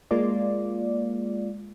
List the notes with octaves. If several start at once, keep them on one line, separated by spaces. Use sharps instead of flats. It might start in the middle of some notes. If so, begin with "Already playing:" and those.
G#3 A#3 F4 D5